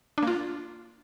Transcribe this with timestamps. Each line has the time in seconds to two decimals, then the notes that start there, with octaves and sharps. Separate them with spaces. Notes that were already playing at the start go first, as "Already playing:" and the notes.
0.18 D4
0.23 A#3
0.27 F4